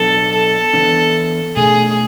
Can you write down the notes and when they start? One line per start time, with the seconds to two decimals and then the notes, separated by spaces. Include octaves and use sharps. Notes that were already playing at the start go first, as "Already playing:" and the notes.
Already playing: B2 F#3 B3 D4 A4
0.31 A4
0.73 E3 B3 D4
1.56 B2 A3 D4 G#4